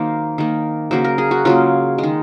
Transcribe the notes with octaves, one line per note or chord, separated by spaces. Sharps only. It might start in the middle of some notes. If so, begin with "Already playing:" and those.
Already playing: D#3 F#3 A#3 C5
D#3 A#3
C#3 F#3 A#3 C5
A#4
G#4
F#4
C#3 F#3 A#3 F4
G#3
D#3